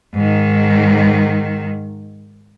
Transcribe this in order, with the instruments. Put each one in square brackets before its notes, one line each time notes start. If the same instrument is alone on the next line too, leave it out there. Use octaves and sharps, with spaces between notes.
[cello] G#2 D#3